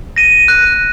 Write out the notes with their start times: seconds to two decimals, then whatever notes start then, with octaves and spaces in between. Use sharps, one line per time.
0.16 A#6 D#7
0.48 F#6